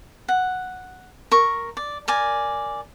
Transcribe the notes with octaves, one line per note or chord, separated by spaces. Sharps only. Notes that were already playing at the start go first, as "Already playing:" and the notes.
F#5
A#4 C#6
D5
A#4 D5 G#5